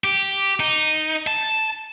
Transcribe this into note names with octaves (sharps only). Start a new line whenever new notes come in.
G4
D#4
A5